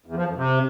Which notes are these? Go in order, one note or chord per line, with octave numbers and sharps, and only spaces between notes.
E2
F3
F2
C3